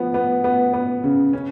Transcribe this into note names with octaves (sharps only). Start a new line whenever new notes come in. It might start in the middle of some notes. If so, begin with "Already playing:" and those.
Already playing: F3 B3
B3
B3
B3
C#3
C#4